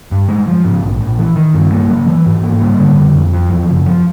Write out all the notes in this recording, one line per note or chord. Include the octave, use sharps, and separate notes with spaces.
G2
G#3
F3
G#2
A#1
A#1
E3
D#3
G2
A#3
F#3
E3
G#2
A#3
G3
D3
F2
F2
F3
E2
F#1
F3